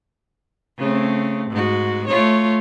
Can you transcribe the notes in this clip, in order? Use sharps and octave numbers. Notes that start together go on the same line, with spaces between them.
C#3 A3 C4
G#2 F#4
A3 F4 C#5